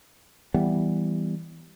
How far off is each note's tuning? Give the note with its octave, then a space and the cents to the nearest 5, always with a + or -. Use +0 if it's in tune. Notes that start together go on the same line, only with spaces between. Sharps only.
E3 +0 G3 +0 B3 +0